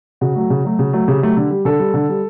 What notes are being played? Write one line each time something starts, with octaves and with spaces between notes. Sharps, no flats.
C#3 F#4
F#3 A3
C#3
F#3 A3
C#3
F#3 A3
C#3 G4
F#3 A3
D3
G3
D3 A4
G3
D3
G3